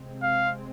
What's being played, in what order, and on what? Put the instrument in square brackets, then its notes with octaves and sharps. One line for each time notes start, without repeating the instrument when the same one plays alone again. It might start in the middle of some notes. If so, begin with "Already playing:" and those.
Already playing: [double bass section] C3 G#3 C4
[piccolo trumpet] F5